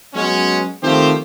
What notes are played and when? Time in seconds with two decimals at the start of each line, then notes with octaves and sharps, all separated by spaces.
0.14 F#3 G#3 B3 C#4
0.82 D#3 F3 A3 C4 G4 C5